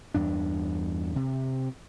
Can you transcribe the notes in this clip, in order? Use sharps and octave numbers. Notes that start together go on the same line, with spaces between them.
E2 G2 D4
C3